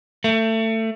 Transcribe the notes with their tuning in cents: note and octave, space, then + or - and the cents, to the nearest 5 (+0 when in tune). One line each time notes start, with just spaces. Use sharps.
A3 +25